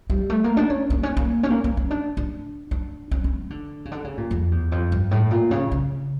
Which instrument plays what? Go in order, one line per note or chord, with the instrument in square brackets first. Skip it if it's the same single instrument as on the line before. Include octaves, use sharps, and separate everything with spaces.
[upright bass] G3
A3
A#3
D4
C#4
A#3
C#4
A#3
C#4
A#3
C#4
C#4
D4
D4
D4
C#4
C#4
E3
D3
C#3
D3
C#3
A#2
F2
E2
F2
G2
A2
A#2
C#3
C#3